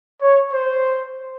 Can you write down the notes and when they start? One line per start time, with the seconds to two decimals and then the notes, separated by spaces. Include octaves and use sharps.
0.20 C#5
0.53 C5